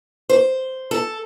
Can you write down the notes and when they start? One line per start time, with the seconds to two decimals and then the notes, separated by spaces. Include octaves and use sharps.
0.29 C5
0.91 A4